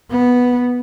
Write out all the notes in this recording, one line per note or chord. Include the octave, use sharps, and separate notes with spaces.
B3